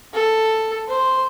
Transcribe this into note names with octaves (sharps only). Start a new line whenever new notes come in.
A4
C5